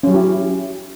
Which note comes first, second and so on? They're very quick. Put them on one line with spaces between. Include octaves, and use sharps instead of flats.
C#4 F#3 G4 E4